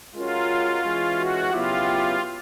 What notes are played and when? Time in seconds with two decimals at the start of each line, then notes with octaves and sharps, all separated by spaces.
0.15 G#3 C#4 F4 F#4 A#4
0.83 E3 G#3 C#4
1.17 F#4
1.51 C#3 F#3 B3 E4 F4 G4